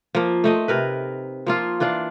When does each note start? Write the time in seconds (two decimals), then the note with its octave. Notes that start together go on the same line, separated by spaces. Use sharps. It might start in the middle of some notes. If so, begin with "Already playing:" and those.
0.15 F3 A#3
0.44 A3 D#4 D#5
0.68 C3 A#4 B4
1.47 F3 A#3 F4
1.80 E3 D4 F4 D5